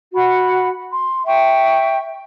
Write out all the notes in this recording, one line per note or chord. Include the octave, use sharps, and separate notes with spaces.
F#4 F#5 B5
C6
E5 G5 C#6